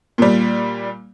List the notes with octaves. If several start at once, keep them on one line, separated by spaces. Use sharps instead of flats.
A#2 G3